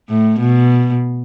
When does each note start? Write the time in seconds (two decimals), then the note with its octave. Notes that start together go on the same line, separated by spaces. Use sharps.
0.10 A2
0.40 B2